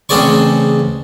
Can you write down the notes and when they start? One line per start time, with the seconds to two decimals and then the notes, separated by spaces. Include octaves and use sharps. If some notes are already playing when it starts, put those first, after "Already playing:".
0.09 A1 C#3 C4 G#4 D5 C#6